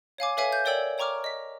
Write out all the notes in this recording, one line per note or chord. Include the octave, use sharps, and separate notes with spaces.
C#5 F5 G#5 D6
A4 B4 C#5 E5 F5 G#5
G6
A#4 C#5 D5 G5 E6 F#7
C#5 G5 A#5 C#6 D6 F6
D#5 B6